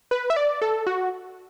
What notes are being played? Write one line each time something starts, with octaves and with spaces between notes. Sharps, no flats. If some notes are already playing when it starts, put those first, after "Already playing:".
B4
E5
D5
A4
F#4